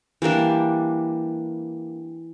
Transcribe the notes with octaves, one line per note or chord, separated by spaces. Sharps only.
E3 G3 A#3 D4